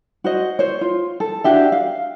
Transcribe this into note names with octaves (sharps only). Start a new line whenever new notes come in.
F#4 C5 D#5
C5 C#5
F4
A4
D4 F#4 G4 E5
F5